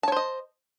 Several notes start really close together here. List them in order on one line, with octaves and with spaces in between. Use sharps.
A5 C#5 C5 D#5